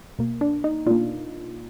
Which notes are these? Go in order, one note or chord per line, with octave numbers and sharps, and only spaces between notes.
B2 A#3
D4
D#4
B2 A#3 D4 F4